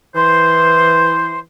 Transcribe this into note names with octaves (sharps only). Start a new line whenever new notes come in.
E3 C5